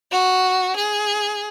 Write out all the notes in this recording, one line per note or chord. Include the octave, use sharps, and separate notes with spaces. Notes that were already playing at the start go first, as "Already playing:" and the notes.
F#4
G#4